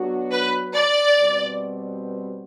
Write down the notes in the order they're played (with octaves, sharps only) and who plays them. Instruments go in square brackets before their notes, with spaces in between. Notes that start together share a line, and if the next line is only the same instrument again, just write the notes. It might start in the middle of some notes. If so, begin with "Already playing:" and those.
Already playing: [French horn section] F#3 B3 D4 F#4
[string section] B4
D5
[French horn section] B2 G3 C4 F#4 B4